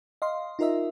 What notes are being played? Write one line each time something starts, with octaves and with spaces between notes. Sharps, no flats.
D#5 F5 C6
D#4 F4 A#4 D#5 E5